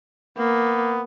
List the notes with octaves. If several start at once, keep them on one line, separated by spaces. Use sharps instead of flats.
A#3 B3